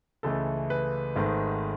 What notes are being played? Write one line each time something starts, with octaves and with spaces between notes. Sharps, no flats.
C#2 C#3 E3 A3 A4
B4
G#1 G#2 D#3 A3